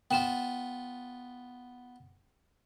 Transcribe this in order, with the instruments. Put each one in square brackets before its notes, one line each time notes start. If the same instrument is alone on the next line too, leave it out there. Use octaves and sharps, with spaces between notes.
[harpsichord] B3 F4 [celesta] G5 E7